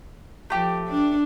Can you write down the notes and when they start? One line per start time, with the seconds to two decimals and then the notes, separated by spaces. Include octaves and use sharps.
0.50 F3 A3 G4
0.88 D4